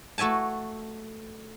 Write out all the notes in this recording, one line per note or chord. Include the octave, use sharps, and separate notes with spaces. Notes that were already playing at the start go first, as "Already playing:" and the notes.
A3 F#4 E5 G#5 A5